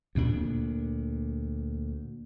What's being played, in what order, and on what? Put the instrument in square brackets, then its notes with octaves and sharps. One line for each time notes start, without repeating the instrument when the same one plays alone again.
[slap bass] D2 A#2 D4